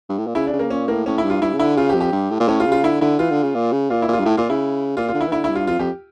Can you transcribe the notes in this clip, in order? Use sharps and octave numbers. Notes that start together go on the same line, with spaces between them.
G2
A2
A#2
C#3 E4
D4
C#3
A#3
A#2 C#4
A2 A#3
A2 C#4
E4
G2
F4
G2 E4
C#3
D3 E4
C#3 F4
G4
F2
G4
G2
A2
A#2
A2 C#4
F4
C#3
F4
D3 E4
D3 E4
E3 F4
D3
C#3
A#2
C#3
A#2 F4
E4
A#2
F4
G2
A2 E4
A#2 F4
C#3 E4
A#2 F4
F4
D3
E4
E3
D3 E4
E4
G2
F4
F2 F4
F2 G4